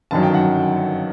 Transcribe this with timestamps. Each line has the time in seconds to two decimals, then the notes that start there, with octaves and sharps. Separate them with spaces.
0.11 G1 F#2 D#3 F#3 A5
0.23 G5
0.34 F#5